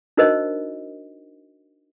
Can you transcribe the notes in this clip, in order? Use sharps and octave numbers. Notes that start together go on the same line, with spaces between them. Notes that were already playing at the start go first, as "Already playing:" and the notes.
D4 D#4 F#4 A#4 C5 D#5